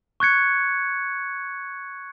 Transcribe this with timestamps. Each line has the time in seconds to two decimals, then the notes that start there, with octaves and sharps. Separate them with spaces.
0.20 C#6 F#6 G#6 C#7